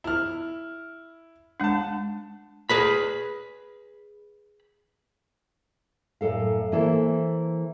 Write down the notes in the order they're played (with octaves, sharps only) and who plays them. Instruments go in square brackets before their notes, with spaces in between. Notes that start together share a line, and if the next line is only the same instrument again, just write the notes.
[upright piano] E4 F6
[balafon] G#3 D4 [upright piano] F#5 A5
[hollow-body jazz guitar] G#4 B4 B5
[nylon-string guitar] F#2 A2 A4 F5
E3 A#3 E4 A4 C5